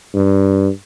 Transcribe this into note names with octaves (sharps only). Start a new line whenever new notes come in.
G2